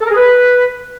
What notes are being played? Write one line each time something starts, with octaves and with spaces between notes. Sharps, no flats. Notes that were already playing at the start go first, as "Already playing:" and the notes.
A4
A#4
G#4
B4